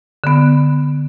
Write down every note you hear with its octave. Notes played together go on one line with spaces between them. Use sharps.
D3 B3